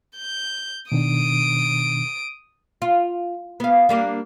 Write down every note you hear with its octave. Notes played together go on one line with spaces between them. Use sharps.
G6
B2 D#3 D4 D#6 D7
F4
B3 F5
G3 A#3 D4